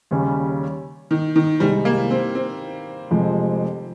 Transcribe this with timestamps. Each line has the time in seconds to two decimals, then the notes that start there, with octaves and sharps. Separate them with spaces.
0.11 D#2 C#3 G3 C#4
1.11 D#3
1.36 D#3
1.60 C2 C3 D#3 G3 G#3
1.85 A#3
2.11 C4
2.35 C4
3.11 F1 F2 C3 F3 G#3